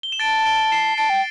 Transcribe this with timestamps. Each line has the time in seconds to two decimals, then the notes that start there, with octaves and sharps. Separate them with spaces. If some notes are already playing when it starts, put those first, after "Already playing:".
0.03 G7
0.12 E7
0.20 A5 A6 D7
0.46 D7 G7
0.72 C7 E7
0.98 A5 A6 D7
1.10 G5